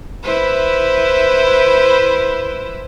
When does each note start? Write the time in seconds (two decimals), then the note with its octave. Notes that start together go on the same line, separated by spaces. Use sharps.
0.23 E4 B4 C5